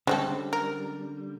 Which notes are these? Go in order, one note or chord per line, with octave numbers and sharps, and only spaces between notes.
D3 G3 G#3 C4 C#4 A4
A#4